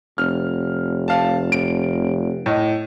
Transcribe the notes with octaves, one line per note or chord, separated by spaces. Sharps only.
F1 F6
F5 A5
D7
A2 D#5